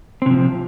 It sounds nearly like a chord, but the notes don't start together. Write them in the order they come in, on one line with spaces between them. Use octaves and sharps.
C4 C3 F3